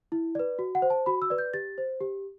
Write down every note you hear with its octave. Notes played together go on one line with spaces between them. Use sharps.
E4
B4 D5
F#4
F#5
C5
A5
F#4 B5
E6
B4 D5
G6
G4 A6
C5
G4